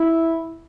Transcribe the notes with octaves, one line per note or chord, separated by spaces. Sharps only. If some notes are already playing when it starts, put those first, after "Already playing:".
Already playing: E4